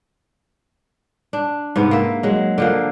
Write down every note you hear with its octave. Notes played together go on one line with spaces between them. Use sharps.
D4
G#2 C3 B3
A#3 E5
F#3 G#3
D3 F3 A#3